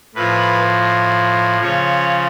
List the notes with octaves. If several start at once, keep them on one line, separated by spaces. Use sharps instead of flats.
A2 F3 B4
C#3 F3 C#5